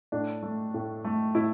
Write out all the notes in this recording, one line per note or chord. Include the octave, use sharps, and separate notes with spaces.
A2 D4
A3
A2
A3
A2 E4